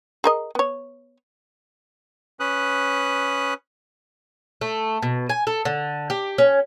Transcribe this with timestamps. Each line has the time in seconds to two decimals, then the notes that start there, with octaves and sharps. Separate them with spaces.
0.24 G#4 A#4 D#5
0.55 B3 C#5
2.40 C#4 B4 D#6 F#6
4.61 A3
5.02 B2
5.30 G#5
5.47 A4
5.65 D3
6.10 G4
6.38 C#4